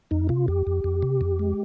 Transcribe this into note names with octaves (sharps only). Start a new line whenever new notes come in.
F2 D#4
C3 F4
F2 G4
F2
F2
C3
F2
G#3